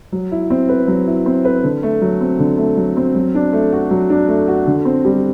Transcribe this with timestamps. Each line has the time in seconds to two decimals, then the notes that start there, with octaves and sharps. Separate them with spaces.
0.12 F#3
0.32 E4
0.50 C4
0.69 B4
0.88 F#3
1.07 E4
1.26 C4
1.45 B4
1.64 D3
1.83 A3
2.02 F#3
2.21 C4
2.39 D3
2.58 A3
2.77 F#3
2.97 C4
3.15 F#3
3.35 D4
3.53 A3
3.72 F#4
3.91 F#3
4.10 D4
4.28 A3
4.48 F#4
4.67 D3
4.85 C4
5.05 G3